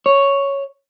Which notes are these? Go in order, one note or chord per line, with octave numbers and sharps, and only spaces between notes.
C#5